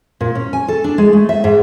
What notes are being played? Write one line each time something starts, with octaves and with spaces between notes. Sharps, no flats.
A#2
C#4
G#5
A4
D4
G#3
A3
E5
G#2